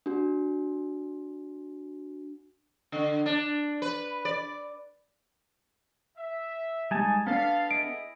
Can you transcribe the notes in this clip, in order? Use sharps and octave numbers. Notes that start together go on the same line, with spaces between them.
D4 F#4
D3
D4
B4
D5
E5
G3 G#3 D#4 G#5 A5
B3 C4 D4 A4 F5
E4 G#4 D#5 D7